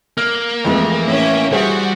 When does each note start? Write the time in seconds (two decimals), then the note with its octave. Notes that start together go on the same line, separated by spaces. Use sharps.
0.17 A#3 F6
0.65 F2 E3 G#3 A3
1.08 A2 C#4 E5
1.52 G3 F#4 G#4 C5